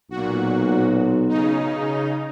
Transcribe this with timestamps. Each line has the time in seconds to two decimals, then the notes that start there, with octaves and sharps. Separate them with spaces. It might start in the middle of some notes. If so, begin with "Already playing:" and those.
0.11 B1 A#2 F#4
1.29 C#3 D#4